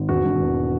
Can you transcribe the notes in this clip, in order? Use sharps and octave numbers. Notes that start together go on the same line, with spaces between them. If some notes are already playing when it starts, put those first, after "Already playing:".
Already playing: G#1
E1 F#4
E1
E2